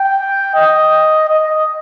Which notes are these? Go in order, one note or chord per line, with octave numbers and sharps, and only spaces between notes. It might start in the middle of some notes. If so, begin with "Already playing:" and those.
Already playing: G5
D#5
D#5